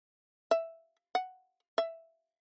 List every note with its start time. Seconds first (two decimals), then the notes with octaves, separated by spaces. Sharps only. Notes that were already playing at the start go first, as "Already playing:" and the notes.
0.51 E5
1.15 F#5
1.78 E5